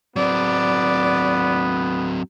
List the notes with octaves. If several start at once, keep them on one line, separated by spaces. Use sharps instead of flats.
F#3 B3 C4 D5